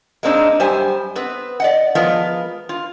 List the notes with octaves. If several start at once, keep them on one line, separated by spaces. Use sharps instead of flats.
G#3 A#3 C4 D4 D#4
F#2 G3 G4 C5 G#5
B3 C4 B4
D5 D#5 F#5
F3 G#3 B3 F4 A#4
F4